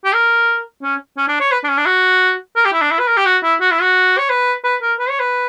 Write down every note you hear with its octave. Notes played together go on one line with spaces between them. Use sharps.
G4
A#4
C#4
C#4
D4
C#5
B4
D4
C#4
D4
F#4
A#4
G4
E4
D4
E4
B4
A#4
G4
F#4
E4
F#4
E4
F#4
C#5
B4
B4
A#4
B4
C#5
B4